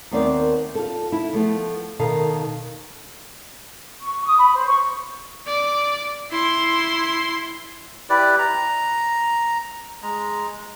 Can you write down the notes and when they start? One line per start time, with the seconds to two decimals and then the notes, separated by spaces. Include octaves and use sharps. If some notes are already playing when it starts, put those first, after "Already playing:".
0.11 D#2 A3 B3 C4 A#4 D5
0.75 F4 A4
1.12 E4
1.33 F3 A3 B3
1.99 B2 D#3 A4 F5
4.02 C#6
4.26 D#6
4.38 B5
4.55 C5
4.66 C#6
5.47 D5
6.31 E4 C6
8.10 E4 G4 B4 D5
8.39 A#5
10.03 G#3 A#5